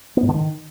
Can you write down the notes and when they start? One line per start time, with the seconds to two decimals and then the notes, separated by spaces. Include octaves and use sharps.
0.17 B3
0.23 G#2
0.29 D3
0.34 D#3